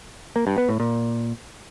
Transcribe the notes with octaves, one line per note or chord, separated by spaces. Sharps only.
A#3
G2
B3
A2
A#2